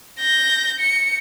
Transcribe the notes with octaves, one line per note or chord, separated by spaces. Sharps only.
G6 A#6
C#7